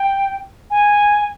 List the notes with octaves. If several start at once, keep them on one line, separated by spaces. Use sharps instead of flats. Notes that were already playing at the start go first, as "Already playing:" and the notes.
Already playing: G5
G#5